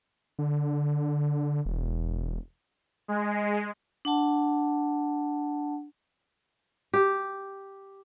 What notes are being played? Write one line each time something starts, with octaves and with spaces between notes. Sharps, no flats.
D3
E1
G#3
D4 F#5 A5
G4